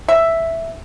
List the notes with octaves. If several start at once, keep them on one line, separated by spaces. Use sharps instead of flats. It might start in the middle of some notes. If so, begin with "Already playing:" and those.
E5